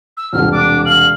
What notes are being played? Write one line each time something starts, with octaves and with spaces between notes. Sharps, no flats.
E6
E1 C2 F6
D4 D6
F5 F#7